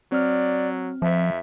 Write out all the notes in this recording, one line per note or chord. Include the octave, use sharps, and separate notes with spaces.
F#3 C4 D5 F6
F2 F3 E5